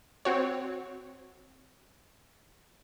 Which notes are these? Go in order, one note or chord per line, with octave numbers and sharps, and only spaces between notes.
C4 F#4 C#5